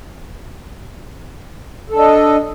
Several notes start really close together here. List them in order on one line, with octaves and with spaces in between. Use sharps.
A4 D4 D#5